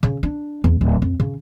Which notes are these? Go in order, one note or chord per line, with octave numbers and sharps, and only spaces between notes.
C#3
D4
E2
D1
F2
C#3